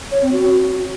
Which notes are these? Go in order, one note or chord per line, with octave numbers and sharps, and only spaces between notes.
C#5
C4
F#4